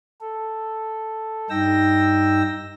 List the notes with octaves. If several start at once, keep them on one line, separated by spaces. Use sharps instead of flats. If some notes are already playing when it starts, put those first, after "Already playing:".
A4
G2 D#4 G5 E6 A#6